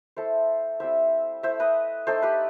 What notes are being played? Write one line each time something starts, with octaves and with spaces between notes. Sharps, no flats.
A3 E4 A4 C5
G3 C4 E4 C5 E5
A3 E4 C5 E5
B4 D#5
A3 D#4 A4 C5
G4 B4